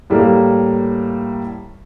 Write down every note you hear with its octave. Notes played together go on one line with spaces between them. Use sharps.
A2 G3 A#3